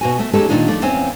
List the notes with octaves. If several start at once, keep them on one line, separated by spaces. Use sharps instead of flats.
B2 F#4 G#5
A3
G#3 C#4 D#4 G4 A4
A#2 D#3 D4 D#4 F4
F3 A3 D4
E2 C4 C#4 F5 G#5